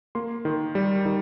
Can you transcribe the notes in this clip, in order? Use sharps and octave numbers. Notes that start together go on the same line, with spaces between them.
A#3 C6
D#3
G3
D#3